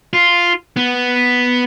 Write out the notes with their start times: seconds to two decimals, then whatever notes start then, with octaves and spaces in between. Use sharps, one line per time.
0.13 F4
0.77 B3